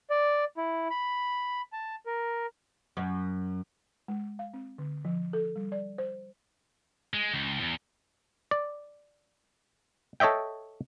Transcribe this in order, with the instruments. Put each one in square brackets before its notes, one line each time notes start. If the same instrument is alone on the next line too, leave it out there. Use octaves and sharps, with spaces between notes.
[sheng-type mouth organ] D5
E4
B5
A5
A#4
[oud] F#2
[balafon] G#3
F5
C4
D3
F3
A4
G3
D5
C5
[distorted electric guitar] G#3
C#2
E2
[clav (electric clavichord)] D5
A4 C#5 D#5 E5 G5